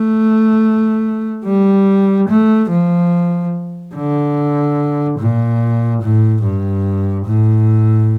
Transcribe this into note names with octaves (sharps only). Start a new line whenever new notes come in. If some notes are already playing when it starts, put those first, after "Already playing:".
Already playing: A3
G3
A3
F3
D3
A#2
A2
G2
A2